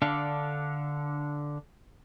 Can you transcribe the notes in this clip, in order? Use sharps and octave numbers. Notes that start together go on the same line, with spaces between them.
D3 D4 A4 F5